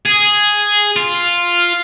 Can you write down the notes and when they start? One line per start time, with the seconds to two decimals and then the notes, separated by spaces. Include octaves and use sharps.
0.06 G#4
0.96 F4